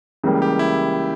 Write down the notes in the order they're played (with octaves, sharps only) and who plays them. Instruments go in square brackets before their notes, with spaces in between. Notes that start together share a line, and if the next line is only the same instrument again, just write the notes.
[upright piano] C#2 C#3 E3 G3 A#3
[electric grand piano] G4
E4